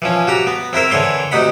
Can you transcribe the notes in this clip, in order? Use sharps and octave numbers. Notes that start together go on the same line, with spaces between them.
E3 F3 C#4
F#4 G4 A#5
B3
C4 E4 A#4 C5
D3 E3 C#5 C6 D6
D2 C3 D#4 F#5 B5